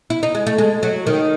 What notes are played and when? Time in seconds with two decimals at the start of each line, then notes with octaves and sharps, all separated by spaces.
0.10 E4
0.23 D#4
0.35 G#3
0.47 A3
0.58 G#3
0.83 F#3
1.07 D#3